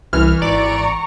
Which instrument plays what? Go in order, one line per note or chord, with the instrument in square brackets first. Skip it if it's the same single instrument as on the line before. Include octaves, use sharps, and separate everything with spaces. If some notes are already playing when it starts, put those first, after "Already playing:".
[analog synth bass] C2 [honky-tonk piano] E3 [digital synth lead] F6
[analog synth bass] G#1 [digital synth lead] D5 [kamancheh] A#5 C#6